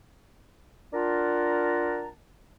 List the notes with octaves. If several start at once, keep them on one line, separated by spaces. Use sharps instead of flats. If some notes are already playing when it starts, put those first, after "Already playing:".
D4 F4 A#4 F#5 A5 A#5